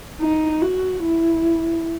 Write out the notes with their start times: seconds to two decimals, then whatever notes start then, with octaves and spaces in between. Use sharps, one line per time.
0.21 D#4
0.62 F#4
1.04 E4